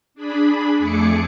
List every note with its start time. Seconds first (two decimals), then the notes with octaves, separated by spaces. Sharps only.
0.14 D4 G#4 B5
0.78 F2 A3 G#4 D6 C#7